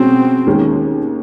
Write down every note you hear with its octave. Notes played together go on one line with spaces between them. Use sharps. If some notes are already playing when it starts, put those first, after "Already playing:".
Already playing: B2 G#3 C4 C#4 F#4
D#2 D#3 G#3 C#4